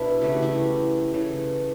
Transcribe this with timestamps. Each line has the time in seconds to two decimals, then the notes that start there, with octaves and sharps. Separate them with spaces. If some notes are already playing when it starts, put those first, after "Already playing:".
Already playing: B2 B3 D4 E4
0.22 C#3 E3 A3 G4
0.32 F#4
0.42 E4 G4
1.13 C#3 E3 A3